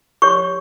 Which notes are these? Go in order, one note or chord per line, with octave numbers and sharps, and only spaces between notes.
G4 C#5 C#6